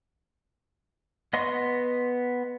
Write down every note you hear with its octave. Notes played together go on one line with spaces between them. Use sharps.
B3 D#5 C6 C#6